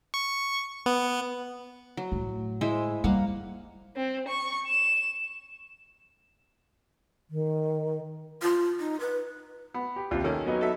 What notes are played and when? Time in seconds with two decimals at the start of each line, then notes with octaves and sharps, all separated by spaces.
0.14 C#6
0.86 B3
1.97 F#3
2.12 A2
2.61 G#3 E4 C5
3.04 G3 A#3 F5 F#5
3.96 C4
4.28 C#6
4.68 E7
7.30 D#3
8.42 F4
8.80 D#4
9.00 B4
9.74 B3
9.96 G4
10.11 D#2 C3 F4
10.24 D#3 A#3 C#4 A4
10.46 F#3 B3 D#4
10.61 A4 E5